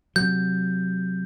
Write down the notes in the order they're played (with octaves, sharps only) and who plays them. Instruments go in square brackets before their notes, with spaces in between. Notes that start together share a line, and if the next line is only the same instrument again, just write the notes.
[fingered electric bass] C3 F#3 [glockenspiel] G6